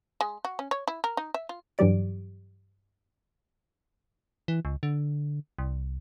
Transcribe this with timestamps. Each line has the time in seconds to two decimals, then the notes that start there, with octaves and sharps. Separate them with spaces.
0.21 G#3
0.45 F#4
0.59 C#4
0.71 C#5
0.88 E4
1.04 A#4
1.17 D#4
1.34 E5
1.49 F4
1.78 G2 E3 F#3 G4 D5 D7
4.48 E3
4.65 C#2
4.83 D3
5.59 C2